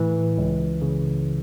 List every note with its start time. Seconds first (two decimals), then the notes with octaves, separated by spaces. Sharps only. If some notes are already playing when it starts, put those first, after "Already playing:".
Already playing: A2 E3
0.38 C#2
0.82 C#3